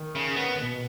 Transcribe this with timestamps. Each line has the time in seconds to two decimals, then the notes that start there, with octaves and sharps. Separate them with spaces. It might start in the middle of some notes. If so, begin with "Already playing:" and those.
Already playing: D#3
0.16 C#3
0.36 B3
0.57 B2